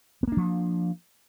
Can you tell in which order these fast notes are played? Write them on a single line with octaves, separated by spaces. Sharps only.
B3 A#3 D4 F3